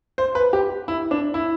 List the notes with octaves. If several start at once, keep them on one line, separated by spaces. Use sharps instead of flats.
C5
B4
G4
E4
D4
E4